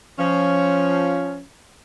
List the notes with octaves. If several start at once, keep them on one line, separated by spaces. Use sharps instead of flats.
F3 C#4